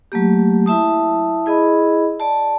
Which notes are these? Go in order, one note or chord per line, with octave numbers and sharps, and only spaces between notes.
F#3 A3 A#3 G4
E4 E5 A5 D#6
E4 G#4 D#5 B5
D5 A5